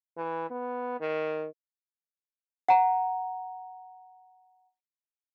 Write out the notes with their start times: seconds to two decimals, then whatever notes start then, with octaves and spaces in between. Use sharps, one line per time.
0.17 E3
0.50 B3
1.00 D#3
2.69 F#5 A#5